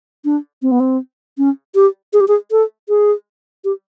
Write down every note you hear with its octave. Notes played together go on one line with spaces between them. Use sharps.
D4
C4
B3
C4
C#4
G4
G#4
G4
G#4
A4
G#4
G4